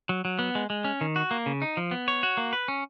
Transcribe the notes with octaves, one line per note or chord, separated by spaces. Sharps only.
F#3
F#3
B3
G#3
G#3
C#4
D#3
F#4
A#3
C#3
D#4
F3
B3
C#5
F#4
A#3
B4
C#4